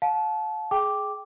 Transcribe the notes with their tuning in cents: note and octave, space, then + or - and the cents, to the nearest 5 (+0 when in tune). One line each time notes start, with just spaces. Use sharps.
F5 +35 A5 -25
G#4 +15 G5 +0 D6 +0